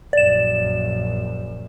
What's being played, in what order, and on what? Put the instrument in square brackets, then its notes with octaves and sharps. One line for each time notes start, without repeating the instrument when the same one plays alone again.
[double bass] A#1 F#2 [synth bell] D5 E7